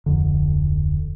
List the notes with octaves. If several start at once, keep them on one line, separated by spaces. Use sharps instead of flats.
D1 F2 D3